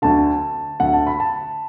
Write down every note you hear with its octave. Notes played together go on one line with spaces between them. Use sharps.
D2 D3 A5
D2 D3 F#5
A5
B5
A5